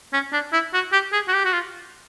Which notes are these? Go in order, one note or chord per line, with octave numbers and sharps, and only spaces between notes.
C#4
D4
E4
F#4
G4
G#4
F#4
G4
F#4
F4